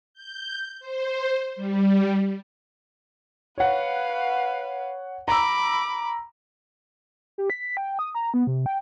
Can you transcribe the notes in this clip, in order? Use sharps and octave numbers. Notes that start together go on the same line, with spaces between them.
G6
C5
G3
B4 C#5 F5 F#5
A#5 B5 D6 E6
G4
B6
G5
D#6
A#5
B3
C3
G5